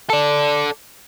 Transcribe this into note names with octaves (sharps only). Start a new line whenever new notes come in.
A4 D5